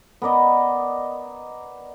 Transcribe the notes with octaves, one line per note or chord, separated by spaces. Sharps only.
B3 A#4 D5 D#5